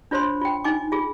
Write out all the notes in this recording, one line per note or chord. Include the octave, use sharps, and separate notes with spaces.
D4 F4 C5 C#5 B5 C6
F4 G5
D#4 G#5 D6
F4 G#4